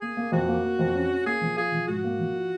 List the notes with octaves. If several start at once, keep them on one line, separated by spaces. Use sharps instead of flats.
A#3 G#4
A#3
F2 F#4
A#3
A#3
F2
C#4
C#4
A#3 G#4
F3
F4 G#4
F3
G#2 F#4
A#3
F3
F4